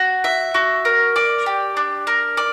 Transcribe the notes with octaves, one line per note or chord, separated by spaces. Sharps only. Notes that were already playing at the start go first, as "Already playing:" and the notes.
Already playing: F#4
E5
F#4
A#4
D5
G4
D4
A#4
D5